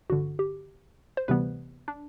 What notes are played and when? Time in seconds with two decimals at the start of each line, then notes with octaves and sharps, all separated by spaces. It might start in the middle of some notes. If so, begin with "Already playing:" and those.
0.10 A1 G2 D3 F#4
0.39 G4
1.17 C5
1.28 D2 C3 E3 G3 B3 B4
1.88 D4